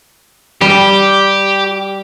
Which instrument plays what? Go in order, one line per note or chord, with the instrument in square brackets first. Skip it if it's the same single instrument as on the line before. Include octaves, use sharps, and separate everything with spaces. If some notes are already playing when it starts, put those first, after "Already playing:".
[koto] G3 [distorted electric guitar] G4